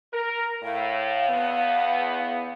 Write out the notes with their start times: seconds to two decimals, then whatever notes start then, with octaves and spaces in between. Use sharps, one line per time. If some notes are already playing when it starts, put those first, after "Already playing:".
0.13 A#4
0.63 A2 F5
1.30 E2 B3